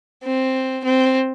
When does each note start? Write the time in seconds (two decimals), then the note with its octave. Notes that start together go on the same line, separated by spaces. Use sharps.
0.23 C4
0.84 C4